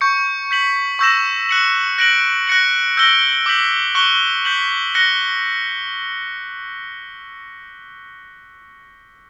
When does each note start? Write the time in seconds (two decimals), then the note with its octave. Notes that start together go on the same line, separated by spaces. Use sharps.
0.01 C#6 G6 C#7
0.51 G6 B6 F#7
0.99 C#6 E6 G6 A#6 E7
1.49 F#6 C#7 F#7
1.98 F#6 A#6 D7 F#7
2.47 F#6 A#6 C#7 F#7
2.97 E6 G6 A#6 D7 G7
3.46 D6 G6 B6 F#7
3.95 C#6 F#6 C#7 G7
4.45 G6 B6 F#7
4.95 F#6 A#6 C#7 G7